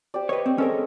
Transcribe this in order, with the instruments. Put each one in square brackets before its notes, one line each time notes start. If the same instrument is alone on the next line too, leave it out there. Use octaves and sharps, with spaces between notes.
[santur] G4 C5 D5
[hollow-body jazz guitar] B4 C#5 [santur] D#5
[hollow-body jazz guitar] C4
[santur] G#3 C#5 [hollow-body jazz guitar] C#4 A4 A#4